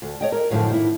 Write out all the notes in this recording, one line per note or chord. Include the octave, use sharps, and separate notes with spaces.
D2
C#5 D#5 G5
A#4
F#2 A2 D3 E3 F3
D#3 A#3 E4